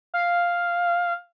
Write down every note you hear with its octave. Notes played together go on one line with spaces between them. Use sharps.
F5